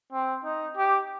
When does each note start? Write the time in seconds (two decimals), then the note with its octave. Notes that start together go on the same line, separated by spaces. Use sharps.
0.13 C4
0.44 D#4
0.77 G4